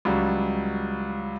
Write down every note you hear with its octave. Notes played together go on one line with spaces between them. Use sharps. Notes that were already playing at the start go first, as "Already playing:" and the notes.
C#2 F#3 G3